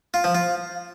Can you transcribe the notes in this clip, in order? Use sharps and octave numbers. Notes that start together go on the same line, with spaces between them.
F4
F3
F4